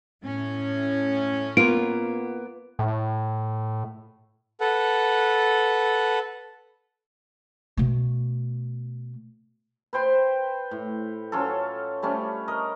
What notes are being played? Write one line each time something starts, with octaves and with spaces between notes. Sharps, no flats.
A2 C#4
A#3 B3 F4 D7
A2
A4 B4 F#5
B2 A3
B4 C5 G5 C6
A2
F#3 C#4 F4 A4
G3 A3 C#4 D4
A#4 D#5